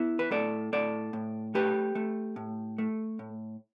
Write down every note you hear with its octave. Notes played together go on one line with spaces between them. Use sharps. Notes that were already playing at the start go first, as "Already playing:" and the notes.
Already playing: B3 E4
B4
A2 A4 D5
A2 A4 D5
A2
A3 G4 B4
A3
A2
A3
A2